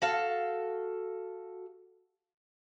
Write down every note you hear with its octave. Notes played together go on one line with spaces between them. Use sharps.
F#4 A4 F5